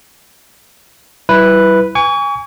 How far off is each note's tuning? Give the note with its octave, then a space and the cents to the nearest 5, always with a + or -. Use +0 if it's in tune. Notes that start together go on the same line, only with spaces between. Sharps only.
G3 -40 E4 +0 B4 +0
G#5 -25 C#6 +35